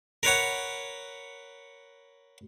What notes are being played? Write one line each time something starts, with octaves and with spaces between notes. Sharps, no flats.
A#4 B4 C#5 F#5